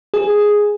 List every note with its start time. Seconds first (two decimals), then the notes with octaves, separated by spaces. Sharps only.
0.14 G#4